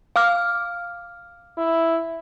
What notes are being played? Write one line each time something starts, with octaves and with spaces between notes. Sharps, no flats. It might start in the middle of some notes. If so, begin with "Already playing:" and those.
F5 D6 F6
E4